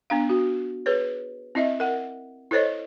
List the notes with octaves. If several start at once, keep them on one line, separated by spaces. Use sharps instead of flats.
B3 D4 F5
F#4
G#4 B4 C#5
C4 E4 D#5 E5
A#4 F#5
E4 A4 C5 C#5 D#5